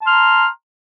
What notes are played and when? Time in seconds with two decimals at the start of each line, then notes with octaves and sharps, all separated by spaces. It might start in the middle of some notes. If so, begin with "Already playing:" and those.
0.01 A5
0.04 C6
0.07 F6
0.10 A#5